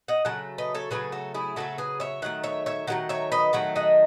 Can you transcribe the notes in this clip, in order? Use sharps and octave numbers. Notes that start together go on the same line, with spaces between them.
D#5 F#5
C#3 F#3 A3 F#5
B4 D#5
A4 C#5
C#3 F#3 A3 G#4 B4
F#4 A4
E4 G#4
C#3 F#3 A3 F#4 A4
G#4 B4
C#5 E5
D#3 F#3 A3 F#5
C#5 E5
C#5 E5
D#3 F#3 A3 F#5
C#5 E5
B4 D#5
D#3 F#3 A3 F#5
D#5 F#5